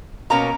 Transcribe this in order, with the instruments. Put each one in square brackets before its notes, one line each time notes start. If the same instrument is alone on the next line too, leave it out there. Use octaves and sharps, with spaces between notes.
[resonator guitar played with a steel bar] B2 A#3 C#4 A#5